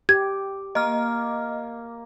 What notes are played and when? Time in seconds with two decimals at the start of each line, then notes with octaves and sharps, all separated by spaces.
0.09 G4 G#6
0.75 A#3 D#5 F6